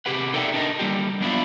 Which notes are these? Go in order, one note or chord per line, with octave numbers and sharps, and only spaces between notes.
C3 G4 G#4 B4 F#5
D#4 A4 A#4 D5 E5 G5
D4 D#4 A#4 D#5
D3 G3 A#3 F4 G4
F#3 B3 D4 E4 F4